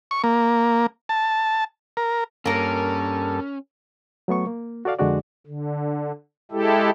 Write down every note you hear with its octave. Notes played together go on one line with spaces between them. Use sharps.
C#6
A#3
A5
A#4
G2 A#3 C#4 A4 A#4
F#3 A3 B3 C#6
A#3
F#4 A4 D5 F5
F2 D3 G#3 D4 F#4 D5
D3
G#3 E4 G4 A4